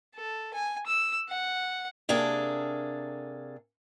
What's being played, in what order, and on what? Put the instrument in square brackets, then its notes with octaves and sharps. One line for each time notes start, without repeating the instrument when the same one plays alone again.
[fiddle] A4
G#5
E6
F#5
[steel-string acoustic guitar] C3 A#3 D4 G#4 A4